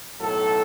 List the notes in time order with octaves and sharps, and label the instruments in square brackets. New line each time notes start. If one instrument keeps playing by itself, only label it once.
[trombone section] B1 A2 F#3 A4